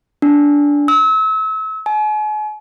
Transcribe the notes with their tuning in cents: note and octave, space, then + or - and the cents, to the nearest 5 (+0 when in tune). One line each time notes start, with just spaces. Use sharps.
D4 -15
E6 -35
G#5 +40